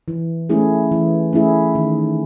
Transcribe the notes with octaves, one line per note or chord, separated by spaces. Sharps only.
E3
A3 C#4 E4 G#4
E3
A3 C#4 E4 G#4
D#3